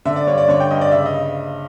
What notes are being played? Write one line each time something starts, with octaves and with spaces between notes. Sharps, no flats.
D3 E5
D5
G2 C#5
D5
D3 C#5
G5
G2 D#5
D5
C#3 E5
D#5